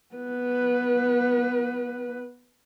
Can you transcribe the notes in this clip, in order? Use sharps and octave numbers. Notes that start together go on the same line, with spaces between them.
B3 B4